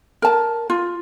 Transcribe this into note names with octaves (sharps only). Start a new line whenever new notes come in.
A#4 A5
F4